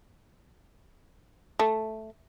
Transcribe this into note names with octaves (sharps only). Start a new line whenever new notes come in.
A3